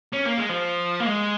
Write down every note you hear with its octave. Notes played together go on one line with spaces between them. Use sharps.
C#4
A#3
G#3
F3
A#3
G#3